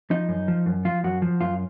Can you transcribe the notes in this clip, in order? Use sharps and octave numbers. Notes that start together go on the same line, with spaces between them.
F3 D#4
F#2
F3
F#2
F3 F4
F#2 F#4
F3
F#2 F4